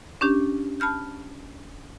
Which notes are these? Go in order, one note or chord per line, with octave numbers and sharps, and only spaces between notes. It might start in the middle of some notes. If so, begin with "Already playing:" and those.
C#4 D4 G4
A5 B5 F6 G6